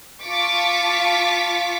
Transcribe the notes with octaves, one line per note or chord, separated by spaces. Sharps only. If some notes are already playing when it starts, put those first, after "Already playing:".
F4 A5 C#6 D6 A6 B6